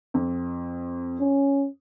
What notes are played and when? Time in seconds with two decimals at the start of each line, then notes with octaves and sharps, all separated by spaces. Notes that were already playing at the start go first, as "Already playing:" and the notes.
0.14 F2
1.20 C#4